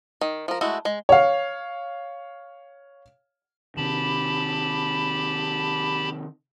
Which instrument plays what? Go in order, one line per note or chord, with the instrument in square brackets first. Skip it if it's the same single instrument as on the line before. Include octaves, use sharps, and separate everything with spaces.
[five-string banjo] D#3
F3 A#4
G#3 A3 E4 F#4
G#3
[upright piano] C#5 F5
[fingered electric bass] C3 D#3 [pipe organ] G4 A5 B5